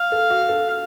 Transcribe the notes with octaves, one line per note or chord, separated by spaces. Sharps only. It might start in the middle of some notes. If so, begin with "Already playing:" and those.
Already playing: F5
A4
F#4
A4